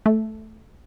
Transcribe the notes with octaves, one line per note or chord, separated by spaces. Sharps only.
A3